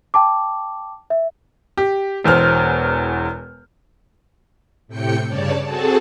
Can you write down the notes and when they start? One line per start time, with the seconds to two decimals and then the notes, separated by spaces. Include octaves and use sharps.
0.14 G5 A5 D6
1.10 E5
1.77 G4
2.24 E1 E2 C5 F6
4.88 A2 C3 G5 G6 C#7
5.28 G2 C#3 C#5 D5 A5
5.63 C4 F#4 G#4 A4 A5